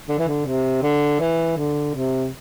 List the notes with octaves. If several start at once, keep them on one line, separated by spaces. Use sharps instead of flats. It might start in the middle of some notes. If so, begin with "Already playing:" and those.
D3
E3
D3
C3
D3
E3
D3
C3